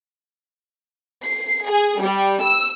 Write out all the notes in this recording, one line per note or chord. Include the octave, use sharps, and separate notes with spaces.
C7
G#4
G3
E6